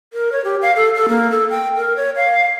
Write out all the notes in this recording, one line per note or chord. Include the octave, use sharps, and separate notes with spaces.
A#4
C#5
G4
F5
A4
A4
A#3
A4
G5
A#4
C#5
F5